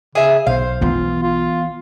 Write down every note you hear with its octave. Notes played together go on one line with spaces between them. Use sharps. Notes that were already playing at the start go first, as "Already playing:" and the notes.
C#3 G#4 E5
B1 C5 F5
E3 B3 F4
F4